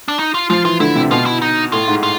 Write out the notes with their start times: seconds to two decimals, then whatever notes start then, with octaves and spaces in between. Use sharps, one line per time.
0.08 D4
0.19 D#4
0.34 F4
0.50 F3 F4
0.65 E3 F4
0.80 D3 E4
0.95 C3
1.11 B2 F4
1.26 E4
1.42 D#4
1.72 A2 F4
1.88 G#2
2.03 F4